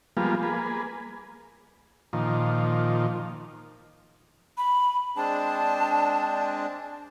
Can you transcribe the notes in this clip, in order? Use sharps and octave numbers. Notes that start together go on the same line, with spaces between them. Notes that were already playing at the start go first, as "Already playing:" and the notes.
F3 G3 G#3 A#3 B3 F4
A#3 G#4 B4
A#2 D#3 F3
B5
G#3 C4 D4 A5